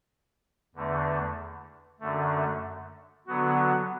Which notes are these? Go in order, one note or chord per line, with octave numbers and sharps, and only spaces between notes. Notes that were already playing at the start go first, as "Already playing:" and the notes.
E2 D3 A3
F#2 D3 A3
D3 F#3 B3 F#4